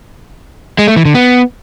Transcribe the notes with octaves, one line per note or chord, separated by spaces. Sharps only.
G#3
A3
E3
D3
B3